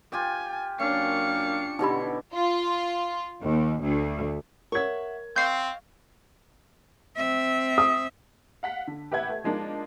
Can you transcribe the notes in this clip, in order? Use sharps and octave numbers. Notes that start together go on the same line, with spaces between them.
F4 G4 G5 G#5
F#2 A#3 C#4 D4 F5 C#7
B2 D3 D#4 E4 G4 B5
F4
D#2
D2
A#4 C#5 E5 F#5 C#6 G#6
C4 D#5 F5 C#6 G6 C7
C4 E5
D#6
F5 F#5 B6
D3
A1 G4 B4 E5 F#5 G#6
A3
F3 G#3 A#3 D4 D#4